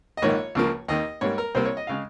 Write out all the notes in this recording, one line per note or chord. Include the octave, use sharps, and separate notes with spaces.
D#5
A#1 G#2 D#3 A#3 C#5
C#2 C#3 F3 A#3
D#2 D#3 A#3 D#5
G#2 G3 A#3 C#5
A#4
C2 C3 G3 A#3 C5
C#5
D#5
C#3 G#3 F5